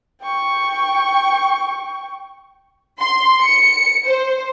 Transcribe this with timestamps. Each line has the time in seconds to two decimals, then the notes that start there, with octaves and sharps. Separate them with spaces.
0.23 G5 C#6
3.00 C6
3.43 C#7
4.05 C5